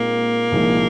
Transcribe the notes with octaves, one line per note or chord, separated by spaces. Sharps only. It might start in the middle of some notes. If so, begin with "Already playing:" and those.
Already playing: A#2 G#3 A#3 C4 D#4
C2 A#2 F3 G#3 D#4